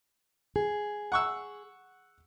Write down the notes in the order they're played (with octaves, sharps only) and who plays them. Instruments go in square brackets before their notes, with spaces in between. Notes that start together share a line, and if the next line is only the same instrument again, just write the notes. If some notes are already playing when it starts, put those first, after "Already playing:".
[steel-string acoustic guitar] G#4
[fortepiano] F#5 C#6 E6